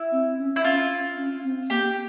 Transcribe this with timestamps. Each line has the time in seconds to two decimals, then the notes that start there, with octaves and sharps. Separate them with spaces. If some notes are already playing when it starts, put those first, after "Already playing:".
Already playing: E4
0.12 C4
0.39 C#4
0.56 E4
0.64 C#4 F4
1.17 C#4
1.44 C4
1.70 A#3 G4